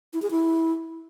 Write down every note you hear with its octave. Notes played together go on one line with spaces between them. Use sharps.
E4
G#4
E4